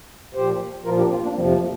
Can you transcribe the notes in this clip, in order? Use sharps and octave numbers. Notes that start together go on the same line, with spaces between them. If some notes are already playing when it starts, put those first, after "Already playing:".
A#2 F3 G4 C5
A#2 F3 F4 A#4
D4 G4
C4 F4
A#3 D4
F2 C3 F3 G3 C4
A#3